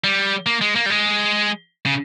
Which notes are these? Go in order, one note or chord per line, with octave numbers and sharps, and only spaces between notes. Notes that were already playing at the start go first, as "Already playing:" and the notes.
G3
A#3
G#3
A#3
G3
G#3
C#3